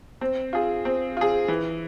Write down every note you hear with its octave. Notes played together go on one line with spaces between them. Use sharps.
C4
F4 G#4
C4
F4 G#4
E3